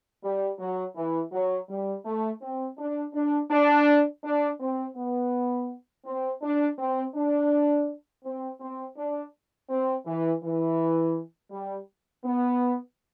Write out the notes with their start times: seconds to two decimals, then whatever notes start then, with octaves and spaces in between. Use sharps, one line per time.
0.24 G3
0.59 F#3
0.96 E3
1.32 F#3
1.69 G3
2.05 A3
2.42 C4
2.78 D4
3.14 D4
3.51 D4
4.24 D4
4.60 C4
4.96 B3
6.05 C4
6.42 D4
6.79 C4
7.15 D4
8.25 C4
8.61 C4
8.97 D4
9.70 C4
10.06 E3
10.43 E3
11.52 G3
12.25 B3